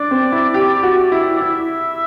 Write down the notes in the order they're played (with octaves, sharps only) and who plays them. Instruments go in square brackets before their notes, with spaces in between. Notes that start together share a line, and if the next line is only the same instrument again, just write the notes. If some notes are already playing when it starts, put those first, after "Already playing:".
Already playing: [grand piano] D4 [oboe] D5
[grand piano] C4
E4
G4
F#4
E4
[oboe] D5
[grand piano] E4 [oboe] E5